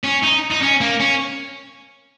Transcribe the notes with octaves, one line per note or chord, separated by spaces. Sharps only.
C#4
D#4
D#4
C#4
A#3
C#4